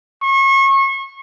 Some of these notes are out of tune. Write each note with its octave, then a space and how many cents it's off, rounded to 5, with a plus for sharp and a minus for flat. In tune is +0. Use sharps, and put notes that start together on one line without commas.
C#6 -30